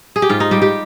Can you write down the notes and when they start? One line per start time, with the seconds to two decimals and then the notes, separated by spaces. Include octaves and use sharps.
0.16 G#4
0.22 G4
0.29 G#2 F4
0.40 D#4
0.51 G3 G4
0.62 G4